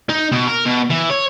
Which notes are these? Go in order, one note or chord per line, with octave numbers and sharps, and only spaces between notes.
D#4
B2
A#4
B2
E3
C#5